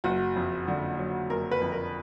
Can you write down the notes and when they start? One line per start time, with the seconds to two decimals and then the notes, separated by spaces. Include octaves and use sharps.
0.04 F#1 F#4
0.36 F2
0.68 D3
0.98 F#3
1.30 F#1 A#4
1.51 B4
1.61 F2
1.72 A#4